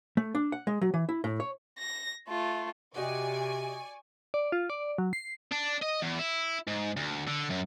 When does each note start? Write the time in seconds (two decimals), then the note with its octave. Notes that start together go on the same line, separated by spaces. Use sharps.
0.17 A3
0.35 D4
0.52 F#5
0.67 G#3
0.81 F#3
0.94 E3
1.09 E4
1.24 A2
1.40 C#5
1.79 A#6
2.29 A3 F4
2.96 C3 F#4 G4 D5 D#5 G#5 C#6
4.34 D5
4.52 F4
4.70 D5
4.98 F#3
5.13 C7
5.52 D4
5.82 D#5
6.02 E2
6.19 E4
6.68 G#2
6.97 D2
7.27 D3
7.50 F#2